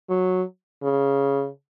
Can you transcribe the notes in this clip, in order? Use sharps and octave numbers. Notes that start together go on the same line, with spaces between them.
F#3
C#3